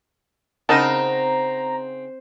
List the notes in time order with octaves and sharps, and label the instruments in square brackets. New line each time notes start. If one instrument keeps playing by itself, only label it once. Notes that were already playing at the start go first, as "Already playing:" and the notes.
[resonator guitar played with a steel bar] C#3 D#4 F#5 [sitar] C4 [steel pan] A#4 D#5 A5 [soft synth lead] A#5